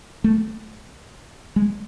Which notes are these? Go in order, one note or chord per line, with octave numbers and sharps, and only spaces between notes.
A3
G#3